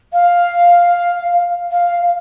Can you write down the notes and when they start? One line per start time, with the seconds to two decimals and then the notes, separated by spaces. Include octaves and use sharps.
0.13 F5
1.71 F5